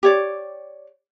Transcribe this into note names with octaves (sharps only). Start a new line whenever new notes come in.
G4 C#5 D5